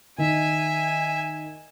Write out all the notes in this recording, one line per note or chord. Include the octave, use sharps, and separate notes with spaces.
D#3 E5 G#5